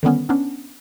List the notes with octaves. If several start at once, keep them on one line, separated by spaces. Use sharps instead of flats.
D3 D#3 G3 B3 C#4
B3 C#4 D4